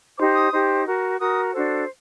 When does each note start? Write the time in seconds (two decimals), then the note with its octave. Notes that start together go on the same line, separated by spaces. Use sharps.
0.18 D#4 G4 C5 D6
0.34 D#6
0.52 D#4 G4 C5
0.85 F#4 A#4
1.19 F#4 A#4 D#6
1.54 D4 F#4 A4 C5